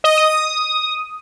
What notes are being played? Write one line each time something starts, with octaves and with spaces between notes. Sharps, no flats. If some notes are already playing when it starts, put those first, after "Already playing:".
D#5
D#6